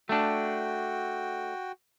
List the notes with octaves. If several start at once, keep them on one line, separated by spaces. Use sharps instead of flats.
A3 D4 F#4 G5